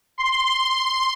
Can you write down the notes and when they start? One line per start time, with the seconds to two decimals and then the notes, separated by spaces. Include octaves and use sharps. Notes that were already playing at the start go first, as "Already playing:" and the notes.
0.18 C6